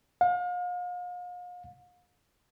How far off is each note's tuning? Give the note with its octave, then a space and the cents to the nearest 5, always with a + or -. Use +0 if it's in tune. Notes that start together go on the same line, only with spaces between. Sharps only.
F5 +40